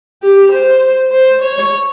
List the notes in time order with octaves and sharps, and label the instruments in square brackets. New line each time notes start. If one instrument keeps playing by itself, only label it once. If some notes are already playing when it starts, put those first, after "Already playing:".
[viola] G4
C5
C5
C#5